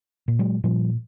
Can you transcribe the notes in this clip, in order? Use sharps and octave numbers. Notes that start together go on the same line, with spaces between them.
A#2
F#3 G#3
A#2 F3 G3